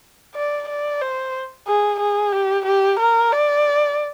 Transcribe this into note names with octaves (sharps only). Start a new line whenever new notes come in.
D5
D5
C5
G#4
G#4
G4
G4
A#4
D5